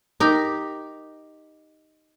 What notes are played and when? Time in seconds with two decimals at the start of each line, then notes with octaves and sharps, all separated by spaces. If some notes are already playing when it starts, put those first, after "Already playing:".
0.20 D#4 G4 A#4